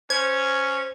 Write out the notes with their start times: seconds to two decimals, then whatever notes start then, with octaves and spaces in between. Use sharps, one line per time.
0.10 C#4 C5 G#6